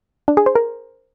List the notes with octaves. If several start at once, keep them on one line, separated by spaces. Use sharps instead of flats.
D4
G#4
C5
A#4